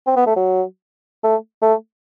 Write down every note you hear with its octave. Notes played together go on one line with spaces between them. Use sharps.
C4
B3
A3
F#3
A3
A3